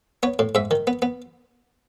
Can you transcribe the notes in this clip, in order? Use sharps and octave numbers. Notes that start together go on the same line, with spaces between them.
B3 C#5
A2
G#2 E5
D#3
B3
B3